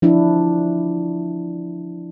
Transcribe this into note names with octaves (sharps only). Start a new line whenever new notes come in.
F3 D4 E4